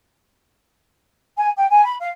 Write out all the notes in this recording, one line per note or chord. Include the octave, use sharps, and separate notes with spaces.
G#5
G5
G#5
B5
F5